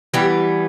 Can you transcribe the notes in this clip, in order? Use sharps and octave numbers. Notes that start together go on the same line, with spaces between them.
E3 G3 B3 G4